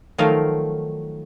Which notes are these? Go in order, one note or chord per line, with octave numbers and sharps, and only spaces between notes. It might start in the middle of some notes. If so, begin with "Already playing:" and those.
D#3 F3 F#3 A3 A#4 F5